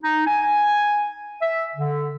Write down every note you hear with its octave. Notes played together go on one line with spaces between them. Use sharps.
D#4
G#5
E5
D3